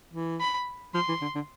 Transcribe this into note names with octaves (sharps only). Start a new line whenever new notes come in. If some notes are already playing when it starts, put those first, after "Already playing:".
E3
B5
F3 C6
E3
D3
D3